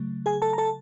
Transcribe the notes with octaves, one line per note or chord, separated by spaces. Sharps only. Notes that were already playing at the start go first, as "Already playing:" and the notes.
Already playing: C#3 F#3 A3
G#4 G#5
A4 A5
A#5
A4 A5